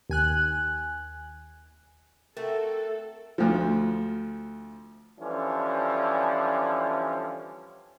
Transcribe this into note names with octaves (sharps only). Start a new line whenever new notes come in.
D#2 G#5 F#6
A3 C4 F#4 A4 A#4
D2 F3
D3 E3 F3 G3 C#4